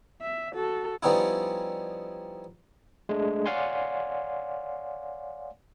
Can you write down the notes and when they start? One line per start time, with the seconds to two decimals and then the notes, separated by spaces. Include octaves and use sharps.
0.22 E5
0.55 F#4 A4
1.03 F3 G3 B3 C#4 D#4 E4
3.09 G#3 A3 D4 G#4
3.46 C#5 D5 F5 F#5 G#5 C6